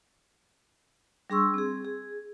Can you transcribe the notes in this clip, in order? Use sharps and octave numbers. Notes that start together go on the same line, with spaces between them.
G3 D4 G#4 C6 C#6 E6
C4 G#4
G#4